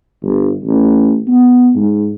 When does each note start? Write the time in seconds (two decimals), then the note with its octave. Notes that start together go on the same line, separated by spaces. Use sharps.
0.22 G1
0.65 A1
1.27 B3
1.75 G#2